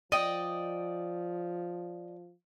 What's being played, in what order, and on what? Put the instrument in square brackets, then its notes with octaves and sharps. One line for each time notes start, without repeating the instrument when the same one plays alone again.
[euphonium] F3 [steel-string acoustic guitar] D5 G5 [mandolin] D#5